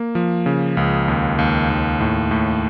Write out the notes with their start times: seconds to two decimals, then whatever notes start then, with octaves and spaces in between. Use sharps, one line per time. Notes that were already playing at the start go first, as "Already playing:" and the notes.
Already playing: A#3
0.15 F3
0.46 C#3
0.77 C#2
1.08 D#2
1.39 D#2
1.70 D#2
2.00 A2
2.31 A2